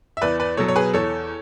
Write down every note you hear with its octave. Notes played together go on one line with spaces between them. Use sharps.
E5
E2 B4 D5
B4 D5
B2 F#3 A4 C#5
C#5
G#4 B4
E2 A4 C#5